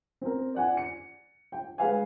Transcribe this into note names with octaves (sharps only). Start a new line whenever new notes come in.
C4 A#4
D5 F#5 G#5
C#7
G5
G#3 B4 F5 G#5